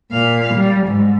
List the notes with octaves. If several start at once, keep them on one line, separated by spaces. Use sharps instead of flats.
A#2 F5
G3
G#2